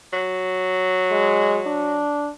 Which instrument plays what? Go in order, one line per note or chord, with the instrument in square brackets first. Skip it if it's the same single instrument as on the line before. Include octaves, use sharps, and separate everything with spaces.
[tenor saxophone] F#3
[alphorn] G#3
D4